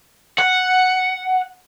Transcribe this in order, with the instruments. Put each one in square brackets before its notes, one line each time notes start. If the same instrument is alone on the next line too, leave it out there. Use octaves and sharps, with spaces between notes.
[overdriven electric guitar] F#5